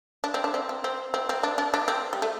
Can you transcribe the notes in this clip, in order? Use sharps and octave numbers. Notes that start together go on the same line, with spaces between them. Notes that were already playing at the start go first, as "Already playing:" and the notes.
D4
C4
D4
C4
C4
C4
C4
C4
D4
D4
D4
C4
G3
A3